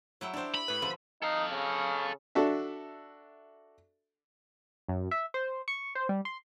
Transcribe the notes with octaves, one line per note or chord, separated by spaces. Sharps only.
F#3 E4 G5
D4 E4 G4 C5
B5
A2 B4
A#2 D3 F3 B4
D#4 A4 F5
C#3
D4 F#4 A4 E5
F#2
E5
C5
C#6
C5
G3
C6